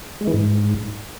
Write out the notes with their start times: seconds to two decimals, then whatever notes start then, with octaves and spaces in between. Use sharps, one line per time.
0.21 G#3
0.27 E3
0.34 G#2